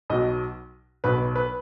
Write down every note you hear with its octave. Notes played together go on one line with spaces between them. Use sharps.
B1 B2 F#3 D#5
B1 B2 F#3 B4
B4